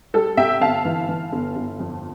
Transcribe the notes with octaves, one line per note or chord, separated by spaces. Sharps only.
G3 A4
C3 E5 G5
G1 F5 A5
E3
E3
G1
G1
F2